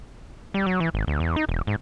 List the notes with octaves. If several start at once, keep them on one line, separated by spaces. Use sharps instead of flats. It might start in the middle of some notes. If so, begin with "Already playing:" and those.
G3
F#3
E3
G#1
D2
E2
D#4
E1
G#2